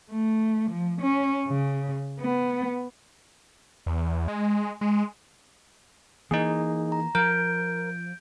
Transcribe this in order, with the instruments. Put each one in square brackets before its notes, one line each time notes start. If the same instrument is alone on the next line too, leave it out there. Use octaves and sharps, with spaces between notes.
[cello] A3
F3
C#4
C#3
B3
[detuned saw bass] E2
G#3
G#3
[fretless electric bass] E3 A#3 [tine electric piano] D#4 G#4
[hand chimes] A#5
[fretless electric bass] F3 [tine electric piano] A#4 [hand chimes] G6 D7